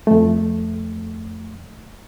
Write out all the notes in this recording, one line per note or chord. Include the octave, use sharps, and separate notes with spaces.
F2 A3